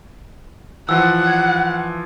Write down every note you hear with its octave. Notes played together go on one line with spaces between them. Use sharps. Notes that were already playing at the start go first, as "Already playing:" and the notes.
E3 F3 F#5 E6
G#6